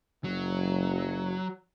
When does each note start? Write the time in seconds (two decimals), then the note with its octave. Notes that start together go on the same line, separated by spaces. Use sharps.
0.24 F#1 F#3